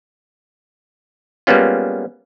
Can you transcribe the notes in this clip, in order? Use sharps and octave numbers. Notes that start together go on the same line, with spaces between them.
G3 G#3 A#3 B3 C#4 F4